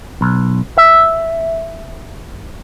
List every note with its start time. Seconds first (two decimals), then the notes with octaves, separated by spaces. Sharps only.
0.21 B1
0.78 E5